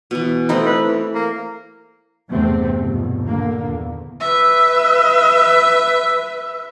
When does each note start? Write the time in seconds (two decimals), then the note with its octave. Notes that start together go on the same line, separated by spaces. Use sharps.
0.11 B2 E3
0.49 A3 C4 D#4 E4
0.67 B4
0.88 E3
1.15 A#3
2.30 E2 G2 C3 A3 C4
2.80 G1 D#2 B2 F3
3.26 A#2 D3 A#3
3.65 E2
4.20 B4 E5